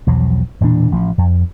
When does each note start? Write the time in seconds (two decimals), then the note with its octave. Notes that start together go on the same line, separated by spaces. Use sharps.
0.07 B1 E2 F3 F#3
0.60 E1 A#2 E3 D4
0.92 A1 F3
1.18 F2